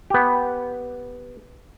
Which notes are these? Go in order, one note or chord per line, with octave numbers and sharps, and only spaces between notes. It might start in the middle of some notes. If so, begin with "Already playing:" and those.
B3 G4